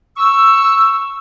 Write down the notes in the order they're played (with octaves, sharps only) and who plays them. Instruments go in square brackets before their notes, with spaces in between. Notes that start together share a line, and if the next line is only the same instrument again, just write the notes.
[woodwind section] C#6 E6